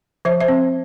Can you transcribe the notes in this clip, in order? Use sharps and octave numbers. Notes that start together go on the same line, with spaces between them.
F3 C5 E5
C5 E5
C4